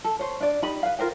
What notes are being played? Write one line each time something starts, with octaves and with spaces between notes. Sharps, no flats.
A4
C5 C#5
D4 D5
D#4 G4 B5
B4 F5
F4 A#4 C5 G5